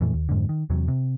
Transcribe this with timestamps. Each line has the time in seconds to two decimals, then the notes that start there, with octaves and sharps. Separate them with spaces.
0.01 F2 A#2 E3 A3
0.14 D#2
0.29 F2 G#2 D3
0.49 D#3
0.70 E2 C3 F#3
0.88 C3